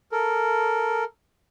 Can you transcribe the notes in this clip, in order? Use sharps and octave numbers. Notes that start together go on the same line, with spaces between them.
A4 A#4